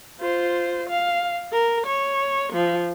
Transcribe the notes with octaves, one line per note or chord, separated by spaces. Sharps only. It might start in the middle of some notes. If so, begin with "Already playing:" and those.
F4 C5
F5
A#4
C#5
F3